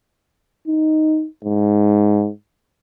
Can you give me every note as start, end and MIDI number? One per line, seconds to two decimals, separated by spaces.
0.67 1.26 63
1.45 2.29 44